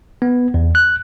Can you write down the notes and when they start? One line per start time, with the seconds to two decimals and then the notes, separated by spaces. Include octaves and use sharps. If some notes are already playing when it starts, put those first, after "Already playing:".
0.22 B3
0.54 E2
0.75 F#6